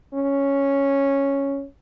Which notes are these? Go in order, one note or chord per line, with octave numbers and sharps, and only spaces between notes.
C#4